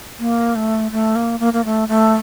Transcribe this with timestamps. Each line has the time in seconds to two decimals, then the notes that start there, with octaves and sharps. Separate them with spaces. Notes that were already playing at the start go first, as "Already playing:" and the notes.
0.19 A#3
0.55 A3
0.91 A3
1.16 A#3
1.40 A#3
1.53 A#3
1.65 A3
1.88 A3